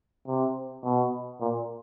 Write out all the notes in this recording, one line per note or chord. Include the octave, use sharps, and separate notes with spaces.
C3
B2
A#2